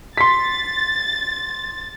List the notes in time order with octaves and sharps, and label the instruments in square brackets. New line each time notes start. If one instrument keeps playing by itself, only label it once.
[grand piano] C6 B6 [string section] A6